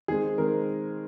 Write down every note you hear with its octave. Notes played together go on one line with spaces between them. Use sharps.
D#3 G#3 C4 G#4
D#3 G#3 C4 A#4